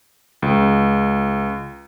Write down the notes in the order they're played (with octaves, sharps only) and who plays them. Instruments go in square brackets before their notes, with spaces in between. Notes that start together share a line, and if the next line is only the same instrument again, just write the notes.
[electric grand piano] C#2